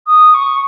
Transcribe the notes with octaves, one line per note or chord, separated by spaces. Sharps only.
D#6
C#6